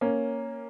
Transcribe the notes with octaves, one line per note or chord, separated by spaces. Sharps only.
A#3 C#4